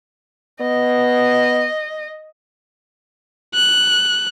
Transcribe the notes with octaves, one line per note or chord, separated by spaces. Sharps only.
B3 D#5
F#6